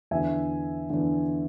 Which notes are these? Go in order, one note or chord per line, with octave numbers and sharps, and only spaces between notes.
E2 D3 E5 G#5
E2 D3